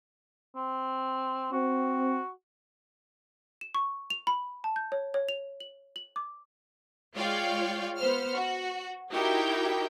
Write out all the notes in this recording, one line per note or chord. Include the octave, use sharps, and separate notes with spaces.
C4
C4 F#4
E7
C#6
F7
B5
A5
G6
C#5
C#5
F7
F#7
F#7
D6
G#3 F4 C#5 D5 F5 G5
B3 C5 F6
F#4
D#4 E4 F#4 G4 A#4 G5